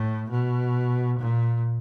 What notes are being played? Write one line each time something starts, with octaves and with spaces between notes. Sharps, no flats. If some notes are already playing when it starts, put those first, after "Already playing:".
Already playing: A2
B2
A#2